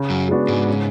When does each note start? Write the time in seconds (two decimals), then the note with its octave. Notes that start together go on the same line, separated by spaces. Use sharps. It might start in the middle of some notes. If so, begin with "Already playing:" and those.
Already playing: C#3
0.10 F#2
0.29 G#3 B3 D4 F#4
0.48 G#2
0.68 C#3